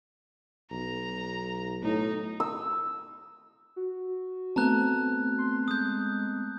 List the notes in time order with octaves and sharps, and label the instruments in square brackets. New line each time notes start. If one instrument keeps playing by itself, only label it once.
[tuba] B1 [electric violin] A#5
[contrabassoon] A2 [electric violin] D#4
[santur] E6
[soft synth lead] F#4
[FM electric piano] A3 B3 C4 [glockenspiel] A5 A#5 F#6
[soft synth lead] C6
[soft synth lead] G#3 [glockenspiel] D#6 G6